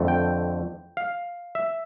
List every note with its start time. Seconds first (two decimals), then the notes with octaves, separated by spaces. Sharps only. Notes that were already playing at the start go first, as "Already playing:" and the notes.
Already playing: F2 D3 A3
0.08 G5
0.97 F5
1.55 E5